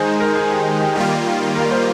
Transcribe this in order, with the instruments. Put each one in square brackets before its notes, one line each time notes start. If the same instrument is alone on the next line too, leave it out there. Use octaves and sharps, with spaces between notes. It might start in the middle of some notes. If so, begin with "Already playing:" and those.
Already playing: [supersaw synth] D#3 G#3 D#4 [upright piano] G#4 C5
[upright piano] A#4
G#4
G4
G4
[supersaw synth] D#3 G3 A#3 F4 [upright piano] G4
[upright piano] A#4
C5